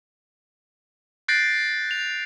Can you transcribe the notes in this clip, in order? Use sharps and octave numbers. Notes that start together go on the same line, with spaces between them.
F#6 G6 A6 A#6 C7 D7
F7